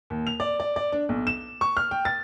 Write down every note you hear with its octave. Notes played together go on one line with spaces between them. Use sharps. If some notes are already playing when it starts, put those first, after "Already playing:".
D#2
F7
D5
D5
D5
D4
B1
E7
C#6
F6
G5
A6